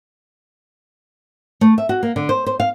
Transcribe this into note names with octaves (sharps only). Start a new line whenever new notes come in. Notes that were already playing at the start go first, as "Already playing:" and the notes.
A3
E5
F#4
A#3
D3
C5
C5
F5